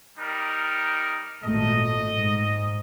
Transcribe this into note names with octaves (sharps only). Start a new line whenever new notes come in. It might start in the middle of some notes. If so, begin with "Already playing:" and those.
G3 D#4 A#4
G#1 A#2 A3 D#5
G#2